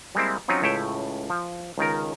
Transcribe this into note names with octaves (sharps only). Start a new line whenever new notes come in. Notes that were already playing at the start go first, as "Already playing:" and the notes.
G3 G#3 A#3 C4 E4
F#3 C4 C#4 D#4 F4
C#2 A2 C#5 E5 G5
F3
C#2 D#3 A#4